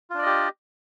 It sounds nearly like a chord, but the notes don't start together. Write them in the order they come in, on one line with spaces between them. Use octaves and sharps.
F4 D4 D5 D#5 G4